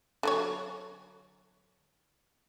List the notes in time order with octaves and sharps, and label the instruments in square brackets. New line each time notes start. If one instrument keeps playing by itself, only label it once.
[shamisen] D3 F#3 C#5